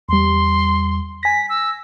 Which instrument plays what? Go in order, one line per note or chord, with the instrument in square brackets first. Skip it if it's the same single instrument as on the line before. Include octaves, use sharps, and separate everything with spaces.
[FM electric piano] E2 G3 [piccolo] C6
[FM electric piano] G#5 A#6 [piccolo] B6
[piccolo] E6